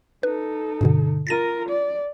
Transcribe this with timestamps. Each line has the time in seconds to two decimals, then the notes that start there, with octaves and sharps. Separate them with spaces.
0.23 D#4 A4 B4
0.81 G2 B2 D3
1.27 F4 A#4 A6 A#6 D#7
1.69 D5